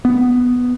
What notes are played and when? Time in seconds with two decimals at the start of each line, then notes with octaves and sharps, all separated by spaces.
0.05 B3